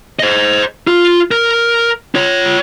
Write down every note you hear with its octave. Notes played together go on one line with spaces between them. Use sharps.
C5 D#5
F4
A#4
F4 C#5